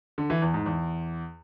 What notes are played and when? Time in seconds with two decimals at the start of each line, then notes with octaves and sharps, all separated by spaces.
0.18 D3
0.30 E3
0.42 E2
0.54 G#2
0.66 E2